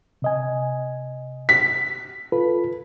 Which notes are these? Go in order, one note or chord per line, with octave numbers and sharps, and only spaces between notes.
C3 D#5 G#5
B6
F4 A4 B4